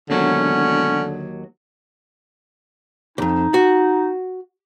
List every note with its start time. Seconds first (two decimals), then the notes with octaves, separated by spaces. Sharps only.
0.10 E1 D#2 D3 F#3 C#4
3.18 C2 F2 D#4
3.54 F#4